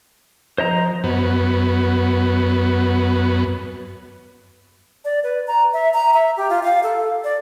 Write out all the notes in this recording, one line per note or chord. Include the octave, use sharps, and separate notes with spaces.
F3 C5 D#5 A#5
F#2 B3
D5
B4
A#5
E5
A#5
E5
G4
F4
F5
A4
D5